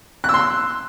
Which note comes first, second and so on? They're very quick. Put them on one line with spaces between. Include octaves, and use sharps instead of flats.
F#6 E6 C6